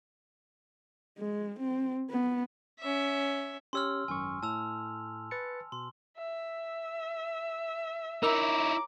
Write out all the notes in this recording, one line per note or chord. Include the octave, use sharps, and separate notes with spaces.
G#3
C4
B3
C#4 E5
C#4 G4 C#5 C6 E6 F6
G#1 F#2 G#5 C#6
A2 A5 E6 F7
B4 A6 C#7
B2 C6
E5
D#4 E4 A#4 C#5 A#5 D6 E6